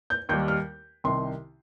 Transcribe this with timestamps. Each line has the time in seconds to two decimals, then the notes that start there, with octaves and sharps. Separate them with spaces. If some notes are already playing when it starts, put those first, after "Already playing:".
0.10 G6
0.29 D#2 D#3 G3 G6
0.48 F6
1.04 C2 C3 D#3 C6